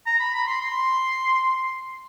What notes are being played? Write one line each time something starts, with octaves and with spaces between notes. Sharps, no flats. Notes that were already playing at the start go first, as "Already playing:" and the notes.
A#5
B5
B5
C6
C6